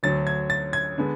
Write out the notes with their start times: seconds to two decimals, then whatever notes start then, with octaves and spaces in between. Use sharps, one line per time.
0.03 D2 D3 F#3 A6
0.27 G#6
0.50 A6
0.73 G#6
0.98 D3 G#3 B3